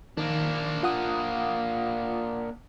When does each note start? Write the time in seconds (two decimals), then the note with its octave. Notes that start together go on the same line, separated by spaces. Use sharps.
0.17 D#3 A#3 D4
0.83 F4 F#5 D#6